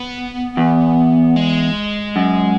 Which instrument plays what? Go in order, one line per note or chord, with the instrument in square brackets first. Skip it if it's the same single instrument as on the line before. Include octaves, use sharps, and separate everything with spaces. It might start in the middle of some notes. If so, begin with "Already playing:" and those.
Already playing: [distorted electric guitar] B3
[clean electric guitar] E2
[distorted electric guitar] G#3
[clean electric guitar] F#2